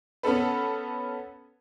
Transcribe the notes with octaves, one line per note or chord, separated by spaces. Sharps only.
B3 C#4 A4 B4